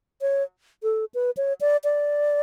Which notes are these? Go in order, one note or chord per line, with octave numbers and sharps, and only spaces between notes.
C#5
A4
B4
C#5
D5
D5